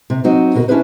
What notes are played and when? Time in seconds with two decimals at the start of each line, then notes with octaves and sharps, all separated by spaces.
0.10 C3
0.24 F#3 C4 D#4 F#4
0.55 D2 B2 F#4 A#4
0.68 C#4 D4 E4 G#4 B4 C5